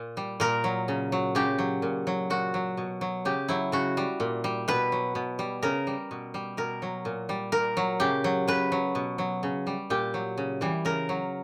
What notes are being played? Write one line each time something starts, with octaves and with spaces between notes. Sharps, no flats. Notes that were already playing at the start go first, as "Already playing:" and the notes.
Already playing: A#2
G3
A#2 A#4
F#3
C#3
F#3
C#3 G4
F#3
A#2
F#3
A#2 F#4
F#3
B2
F#3
C#3 G4
F#3 E4
C#3 F#4
G3
A#2
G3
B2 B4
F#3
B2
G3
C#3 A#4
G3
B2
G3
B2 A#4
F#3
A#2
G3
A#2 A#4
F#3
C#3 G4
F#3
C#3 B4
F#3
B2
F#3
C#3
G3
A#2 G4
F#3
C#3
E3 G3
C#3 A#4
F#3